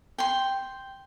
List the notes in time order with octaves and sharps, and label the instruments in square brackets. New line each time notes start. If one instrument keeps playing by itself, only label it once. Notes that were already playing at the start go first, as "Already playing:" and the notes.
[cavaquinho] G5 C6